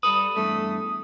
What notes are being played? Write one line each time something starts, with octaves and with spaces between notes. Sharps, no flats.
G3 A4 B4 D#6
E2 G2 A3